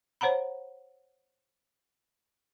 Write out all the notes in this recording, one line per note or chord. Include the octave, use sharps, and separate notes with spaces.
C5 C#5 F#5 A#5 B5